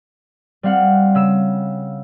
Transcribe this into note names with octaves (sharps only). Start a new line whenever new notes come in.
G3 C4 F5 F#5
C#3 E6 E7